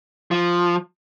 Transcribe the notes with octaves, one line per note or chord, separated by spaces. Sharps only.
F3